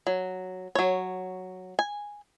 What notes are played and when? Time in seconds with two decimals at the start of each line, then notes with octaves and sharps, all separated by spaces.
0.07 F#3
0.75 F#3 C#5
1.79 G#5